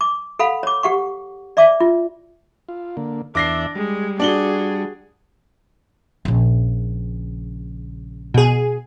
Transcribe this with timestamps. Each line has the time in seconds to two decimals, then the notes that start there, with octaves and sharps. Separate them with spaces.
0.01 D6
0.39 A4 F5 F#5 B5
0.63 C#5 D6
0.83 G4 F#5 C#6
1.57 D5 E5 D6
1.80 F4
2.69 F4
2.97 D3 A#3
3.35 E2 D4 E5 D6 A#6 C7
3.76 G3 G#3
4.20 D4 F#4 G#4 F#7 G7
6.25 A#1 C#3
8.34 B2 G#4